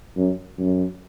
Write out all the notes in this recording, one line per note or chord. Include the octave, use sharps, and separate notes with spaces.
F#2
F#2